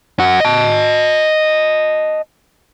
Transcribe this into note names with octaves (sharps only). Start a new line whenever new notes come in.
F#2 F#4
D#5 A5